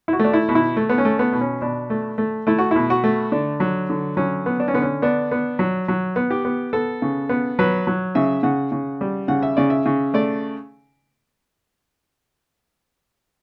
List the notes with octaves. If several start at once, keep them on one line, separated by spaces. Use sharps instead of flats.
E4
F#4
A3 D4
E4
B2
E4
A3
B3
C#4
A3
B3
B2
C#4
B2 D4
A3
A3
A3 E4
F#4
B2 E4
F#4
A3
D3 D4
F#3
D3
F#3 C#4
B3
D4
C#4
D3 B3
C#4
B3 D4
B3
F#3
F#3
B3
G4
B3
B3 A4
C#3
B3
F#3 B4
F#3
C#3 E5
C#3 F#5
C#3
G3
C#3 F#5
E5
C#3 D5
E5
C#3
A3 D5